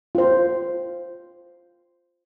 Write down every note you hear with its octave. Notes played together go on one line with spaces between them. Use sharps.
F4 C5